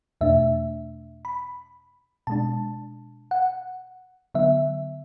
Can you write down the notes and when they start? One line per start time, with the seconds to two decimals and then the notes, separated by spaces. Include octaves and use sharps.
0.21 E2 B2 A3 D4 E5
1.25 B5
2.27 B2 G#3 D4 A5
3.31 F#5
4.34 D3 F#3 B3 E5